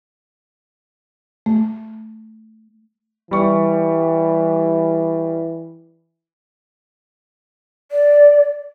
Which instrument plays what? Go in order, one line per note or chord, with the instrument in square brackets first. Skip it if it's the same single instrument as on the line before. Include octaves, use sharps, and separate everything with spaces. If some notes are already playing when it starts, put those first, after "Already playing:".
[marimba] A3
[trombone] E3 [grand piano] G3 C#6
[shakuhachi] D5